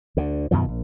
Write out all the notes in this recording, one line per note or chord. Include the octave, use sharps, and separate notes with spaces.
D2 D3
F#2 B2 D#3 F3
A#1